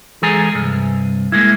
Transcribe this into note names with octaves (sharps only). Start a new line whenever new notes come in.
E3 G#3 G#4 A4 G#5 A#5
C2 G2
G#3 A#3 E4